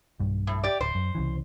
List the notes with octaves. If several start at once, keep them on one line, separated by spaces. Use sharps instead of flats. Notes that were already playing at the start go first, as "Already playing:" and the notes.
B1 G2
A2
G4 D5
D1 C5
F#2
C2 C#3 E3